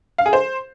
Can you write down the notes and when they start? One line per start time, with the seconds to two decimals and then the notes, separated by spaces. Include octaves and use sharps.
0.18 F5
0.26 G#4
0.33 C5